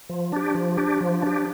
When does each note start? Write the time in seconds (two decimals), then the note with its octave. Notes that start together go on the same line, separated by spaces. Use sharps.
0.09 F3
0.32 D4 G4
0.55 F3
0.77 D4 G4
1.01 F3
1.22 D4 G4